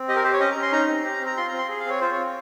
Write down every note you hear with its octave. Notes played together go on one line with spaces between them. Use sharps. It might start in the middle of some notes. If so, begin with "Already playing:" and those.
Already playing: C4
G4 D#5
A#4
G4 C5
C#5
C#4 D#5
C#4 A#5
C6
D#4 A#5
C4
G4
C4
A#5
F4 C6
C4 A#5
C6
G#4
F5
C4 C#5
F4 C5
C#5
C4